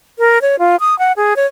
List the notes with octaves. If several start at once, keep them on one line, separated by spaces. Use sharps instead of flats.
A#4
C#5
F4
D#6
F#5
G#4
C#5